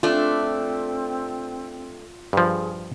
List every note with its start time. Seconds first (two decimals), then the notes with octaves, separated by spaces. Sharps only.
0.03 A3 C4 D4 F4
2.33 G2 F3 G#4